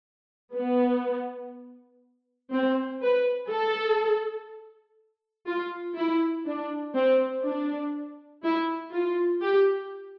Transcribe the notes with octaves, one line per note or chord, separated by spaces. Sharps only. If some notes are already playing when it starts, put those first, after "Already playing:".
B3
C4
B4
A4
F4
E4
D4
C4
D4
E4
F4
G4